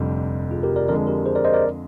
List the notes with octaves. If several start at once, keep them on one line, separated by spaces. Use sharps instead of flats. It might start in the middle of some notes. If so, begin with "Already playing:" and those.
Already playing: F1 F2 D3 G3
F4 G#4
G4 A#4
A#4 D5
F2 D3 G#3 A#4 D5
G4 A#4
G#4 C5
A#4 D5
C5 D#5
A#4 D5